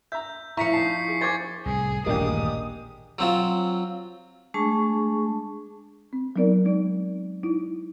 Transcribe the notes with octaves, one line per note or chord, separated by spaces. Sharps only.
E5 A#5 G6
F3 E4 A#5 C#6 B6 C#7
D#4 A5 C7
G#4
C5 G#5 C#6 D6 G#6 A6
C2 A2 G#4
D#1 A1 G2 G#3 A#3 D4 G4 D#6
F#3 C4 F4
G#3 A3 D4 G#4 A5 C#6
C4
F#3 B3 C4 D#4 A#4 D5
G#3 D#4 D5
D#4 E4